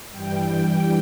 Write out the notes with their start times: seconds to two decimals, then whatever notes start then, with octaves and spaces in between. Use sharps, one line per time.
0.11 G2 E3 G3 G5